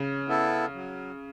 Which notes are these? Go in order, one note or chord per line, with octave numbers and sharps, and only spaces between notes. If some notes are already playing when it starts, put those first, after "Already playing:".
Already playing: C#3
B3 E4 A4
F#3